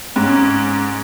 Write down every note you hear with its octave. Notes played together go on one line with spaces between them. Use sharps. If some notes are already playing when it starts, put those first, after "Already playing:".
G#2 C#4